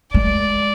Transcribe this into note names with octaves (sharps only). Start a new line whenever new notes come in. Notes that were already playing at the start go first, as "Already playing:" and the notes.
G#3 D5